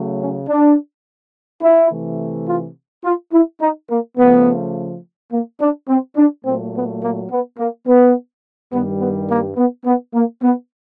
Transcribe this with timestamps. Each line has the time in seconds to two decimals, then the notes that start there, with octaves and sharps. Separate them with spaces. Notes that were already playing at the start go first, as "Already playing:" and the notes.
Already playing: C#3 F#3 A3
0.21 C#4
0.49 D4
1.62 E4
1.91 C3 E3 A3
2.47 F4
3.04 F4
3.33 E4
3.61 D#4
3.90 A#3
4.17 C#3 F3 A3 B3
5.32 A#3
5.60 D4
5.89 C4
6.16 D4
6.45 A#2 F#3 A3 C4
6.74 B3
7.01 A#3
7.31 B3
7.59 A#3
7.87 B3
8.72 G2 D#3 G3 B3
9.00 B3
9.29 A#3
9.57 B3
9.85 B3
10.14 A#3
10.43 B3